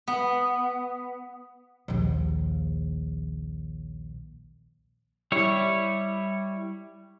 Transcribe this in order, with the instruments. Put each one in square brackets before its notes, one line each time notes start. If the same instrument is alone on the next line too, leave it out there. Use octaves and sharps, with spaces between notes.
[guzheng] B3
[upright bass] A#1 D#2
[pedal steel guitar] G3 E4 C#5